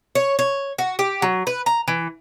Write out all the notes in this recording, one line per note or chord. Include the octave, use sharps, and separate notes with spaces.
C#5
C#5
F#4
G4
F#3
B4
A#5
E3